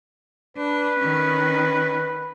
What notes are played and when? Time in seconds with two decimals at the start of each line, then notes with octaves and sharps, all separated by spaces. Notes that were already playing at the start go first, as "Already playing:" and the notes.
0.57 D4 B4
0.99 D#3 C#4